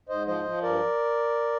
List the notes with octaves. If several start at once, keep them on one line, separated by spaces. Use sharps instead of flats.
G#2 C5 D#5
F3 C5 D#5
F3
G2 A#4 D5